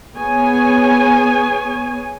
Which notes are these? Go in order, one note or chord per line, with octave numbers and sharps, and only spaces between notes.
B3 G#4 C#5 G#5